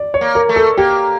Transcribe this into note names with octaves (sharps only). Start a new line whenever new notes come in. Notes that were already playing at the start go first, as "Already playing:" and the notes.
Already playing: D5
C#5
A#3
A#4
A3
A4
A#3 G4